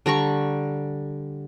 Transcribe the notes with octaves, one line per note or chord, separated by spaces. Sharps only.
D3 G3 A#5 C#6